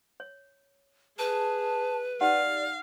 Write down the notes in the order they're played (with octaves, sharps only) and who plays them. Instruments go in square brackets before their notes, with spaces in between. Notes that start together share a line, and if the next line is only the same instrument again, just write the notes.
[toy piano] C#5
[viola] G#4 [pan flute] B4 [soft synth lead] A5
[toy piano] D#4 G4 F#5 [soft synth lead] D5 [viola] F5